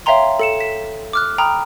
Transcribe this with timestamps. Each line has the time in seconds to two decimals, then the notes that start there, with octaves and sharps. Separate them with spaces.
0.06 C#5 E5 F5 G5 A#5 C6
0.39 A4 C#7 E7
0.60 B6 E7
1.13 D6 F6 F#6
1.38 G5 A#5 B5 D#6 F6